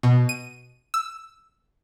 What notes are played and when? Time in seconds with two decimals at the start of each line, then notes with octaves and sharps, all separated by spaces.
0.03 B2
0.29 D#7
0.94 E6